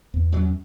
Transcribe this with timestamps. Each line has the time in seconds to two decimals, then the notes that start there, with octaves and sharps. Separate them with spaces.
0.14 E2
0.32 F#2 F#3